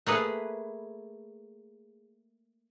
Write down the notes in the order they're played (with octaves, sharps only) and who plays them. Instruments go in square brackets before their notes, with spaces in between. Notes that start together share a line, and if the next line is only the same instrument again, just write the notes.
[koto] A3 A#3 G#4 B4